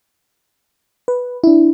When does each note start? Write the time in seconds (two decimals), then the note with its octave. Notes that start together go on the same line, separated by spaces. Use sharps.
1.08 B4
1.44 D4 E4